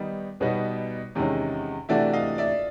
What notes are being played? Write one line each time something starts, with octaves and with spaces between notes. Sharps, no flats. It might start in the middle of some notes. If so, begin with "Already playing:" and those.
Already playing: D#3 G3 B3 D#4
B2 G3 B3 D#4 F#4 B4 C#5
E2 C3 D#3 G#3 C#4
C3 E3 A3 D4 F#4 D5 E5
D#5 F5
D5 E5